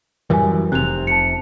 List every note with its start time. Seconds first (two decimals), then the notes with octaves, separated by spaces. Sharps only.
0.30 F#2 E3 G3 A#4 G#5
0.72 F1 C3 F#6 F7
1.07 A5 C#7